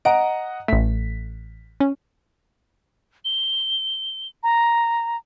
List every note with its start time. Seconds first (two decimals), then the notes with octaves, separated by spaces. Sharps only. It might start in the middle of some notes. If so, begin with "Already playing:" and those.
0.05 D#5 F#5 A#5 D7
0.68 A1 A3 B6
1.80 C#4
3.25 G7
4.43 A#5